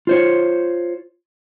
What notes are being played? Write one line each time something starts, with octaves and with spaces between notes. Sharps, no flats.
F4 C5 C#5